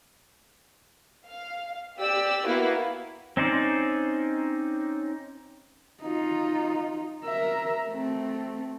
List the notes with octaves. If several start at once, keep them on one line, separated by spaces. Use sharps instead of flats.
F5
G4 D5 E6
A#3 B3 E4 F#4 F5
C4 C#4 D#4 C5 D5
D#4 F4
A#4 E5
A3 C4